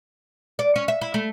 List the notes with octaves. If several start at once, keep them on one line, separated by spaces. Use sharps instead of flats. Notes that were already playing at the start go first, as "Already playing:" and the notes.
D5
C#4
E5
E4
A3